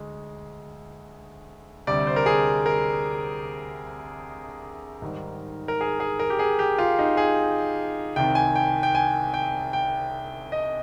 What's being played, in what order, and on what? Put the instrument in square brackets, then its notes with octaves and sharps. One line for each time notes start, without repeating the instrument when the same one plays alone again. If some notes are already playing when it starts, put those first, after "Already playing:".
Already playing: [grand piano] D2 G#3
D2 C3 G3 D5
C5
A#4
G#4
A#4
G#2 D#3 G3
A#4
G#4
G#4
A#4
G4
G#4
G4
F4
D#4
G#4
C2 C3 D#3 G5
G#5
G5
G5
G#5
G5
G5
D#5